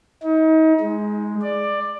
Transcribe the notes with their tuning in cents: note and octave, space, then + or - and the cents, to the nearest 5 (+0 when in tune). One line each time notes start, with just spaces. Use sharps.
D#4 +35
G#3 +5
D5 +15